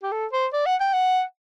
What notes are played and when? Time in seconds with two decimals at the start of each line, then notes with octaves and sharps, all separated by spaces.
0.03 G4
0.12 A4
0.32 C5
0.53 D5
0.66 F#5
0.80 G5
0.93 F#5